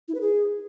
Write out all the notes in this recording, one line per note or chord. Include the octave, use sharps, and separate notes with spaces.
E4
B4
G#4